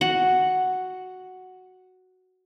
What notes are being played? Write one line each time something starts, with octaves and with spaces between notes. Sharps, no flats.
F#4 F#5